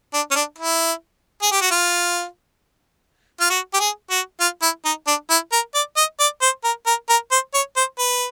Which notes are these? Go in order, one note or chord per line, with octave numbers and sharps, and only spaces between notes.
D4
C#4
D4
E4
G#4
G4
F#4
F4
F4
F#4
G4
G#4
F#4
F4
E4
D#4
D4
E4
A#4
D5
D#5
D5
C5
A#4
A#4
A#4
C5
C#5
C5
B4